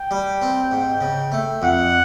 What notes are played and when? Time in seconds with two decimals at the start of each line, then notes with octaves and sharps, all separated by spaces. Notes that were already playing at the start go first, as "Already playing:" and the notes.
Already playing: G5
0.11 G3
0.42 C4
0.71 G#2
1.01 C#3
1.32 A3
1.61 F2 F#5